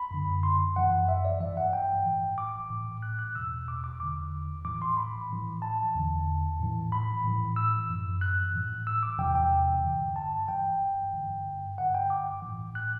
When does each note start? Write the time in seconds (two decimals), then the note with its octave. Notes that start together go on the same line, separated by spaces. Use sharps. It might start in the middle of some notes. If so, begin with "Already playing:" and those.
Already playing: B5
0.11 F#2 D3
0.43 C6
0.76 F#2 E3 F#5
1.08 E5
1.25 D5
1.41 G2 E3 E5
1.57 F#5
1.73 G5
2.05 A2 E3
2.38 D6
2.70 A2 E3
3.02 F#6
3.19 F#6
3.35 E2 B2 E6
3.68 D6
3.84 D6
4.00 E2 D3 D6
4.65 A2 E3 D6
4.82 C6
4.97 B5
5.30 A2 E3
5.62 A5
5.94 E2 D3
6.59 A2 E3
6.92 B5
7.24 A2 E3
7.56 E6
7.89 F#2 E3
8.21 F#6
8.54 A2 E3
8.87 E6
9.03 D6
9.19 E2 C3 E3 G5
9.35 G5
9.84 G2 D3
10.16 A5
10.48 G2 E3 G5
11.13 G2 D3
11.78 G2 D3 F#5
11.95 G5
12.10 D6
12.43 A2 E3
12.75 F#6